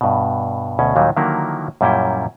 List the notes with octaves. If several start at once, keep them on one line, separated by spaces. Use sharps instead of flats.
G2 B2
D2 B2 C#4
D#2 A#2 D#3 F#3 G3
D3 D#3 F3 F#3 A#3 E4
F#2 A#2 G3 C#4 E4 G5